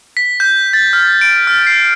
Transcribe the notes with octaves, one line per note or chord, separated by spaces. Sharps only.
B6
G6
A6
F6
D7
F6
C7